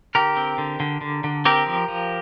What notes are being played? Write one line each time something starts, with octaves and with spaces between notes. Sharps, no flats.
D3 G4 A#4
C4
D3
D3
D3
D3
C4 G4 A#4
F3
F3